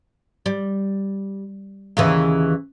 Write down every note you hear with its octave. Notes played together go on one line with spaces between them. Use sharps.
G3
D#2 C#3 E3